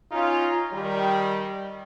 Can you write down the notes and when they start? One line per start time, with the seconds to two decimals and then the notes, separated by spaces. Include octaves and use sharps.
0.12 C#4 D#4 F4
0.73 D#3 G3